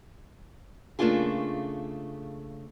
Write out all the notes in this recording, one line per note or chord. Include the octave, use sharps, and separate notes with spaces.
C#3 A3 A#3 D4 F4 G#4